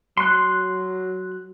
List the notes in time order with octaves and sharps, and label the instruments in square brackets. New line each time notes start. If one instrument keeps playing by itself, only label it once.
[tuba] F#3 [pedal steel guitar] C6 F#6